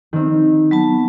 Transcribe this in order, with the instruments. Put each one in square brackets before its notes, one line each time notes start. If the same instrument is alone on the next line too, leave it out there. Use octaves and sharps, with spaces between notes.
[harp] D#3 C4
[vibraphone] F#3 B3 A5